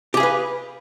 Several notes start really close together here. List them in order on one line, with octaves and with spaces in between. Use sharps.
G4 G#4 F5 B4